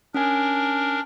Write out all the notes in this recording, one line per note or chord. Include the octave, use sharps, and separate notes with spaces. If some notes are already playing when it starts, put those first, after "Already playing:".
C#4 D4 A#4 G#5